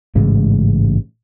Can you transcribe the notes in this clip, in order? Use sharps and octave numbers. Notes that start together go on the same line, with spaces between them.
A1 G#2 C#3 G#3